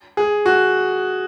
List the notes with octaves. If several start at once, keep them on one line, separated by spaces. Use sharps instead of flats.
G#4
F#4